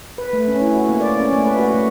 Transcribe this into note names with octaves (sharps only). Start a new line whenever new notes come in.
B4
A3
C#4
E4
F#4
A#3
D5
C#4
A3
B4
F#4
A3